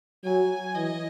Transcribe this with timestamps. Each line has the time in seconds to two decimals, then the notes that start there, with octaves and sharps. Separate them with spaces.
0.24 F#3 G#5
0.75 E3 D#5